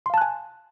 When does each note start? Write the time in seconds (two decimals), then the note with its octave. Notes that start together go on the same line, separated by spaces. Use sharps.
0.06 C6
0.10 F5
0.14 A5
0.18 F#6
0.21 G#5